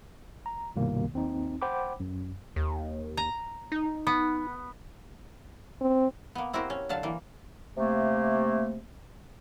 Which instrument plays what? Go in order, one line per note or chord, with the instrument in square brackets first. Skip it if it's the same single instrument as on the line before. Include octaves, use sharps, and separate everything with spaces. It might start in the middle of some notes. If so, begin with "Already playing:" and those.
[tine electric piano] A#5
C2 G2 B2 D#3 A#3
D#2 C4 D#4
C5 F#5 G5 B5 D6
F#2
[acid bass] D#2
[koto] A#5
[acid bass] D#4
[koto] B3
[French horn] C4
[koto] A#3 B3
C4 E4 F#4 G4 A#4 C5
C#4
D3 F#3 F5 A5
E3 A#3
[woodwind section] C3 A3 A#3